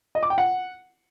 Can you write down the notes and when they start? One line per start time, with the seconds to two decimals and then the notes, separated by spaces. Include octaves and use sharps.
0.15 D#5
0.23 D6
0.30 G5
0.38 F#5